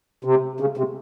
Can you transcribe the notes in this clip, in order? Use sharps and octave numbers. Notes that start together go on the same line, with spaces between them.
C3
C#3
C3